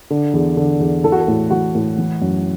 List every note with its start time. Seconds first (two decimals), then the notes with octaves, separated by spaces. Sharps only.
0.10 D3
0.34 E2
0.57 D3
0.80 E2
1.04 E3 A4
1.12 F#4
1.20 A4
1.28 A2
1.50 E3 F#4
1.75 A2
1.98 E3
2.22 F#2